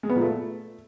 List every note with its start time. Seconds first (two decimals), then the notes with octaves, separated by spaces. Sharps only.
0.03 G#3
0.09 B3
0.16 A#2
0.22 A3